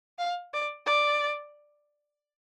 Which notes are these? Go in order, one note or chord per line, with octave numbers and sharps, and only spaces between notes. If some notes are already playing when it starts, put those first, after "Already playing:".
F5
D5
D5